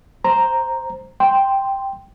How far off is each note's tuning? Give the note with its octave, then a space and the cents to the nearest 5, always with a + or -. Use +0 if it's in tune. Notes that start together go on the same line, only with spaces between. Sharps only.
C5 +0 A#5 +0
G5 +0 C6 +0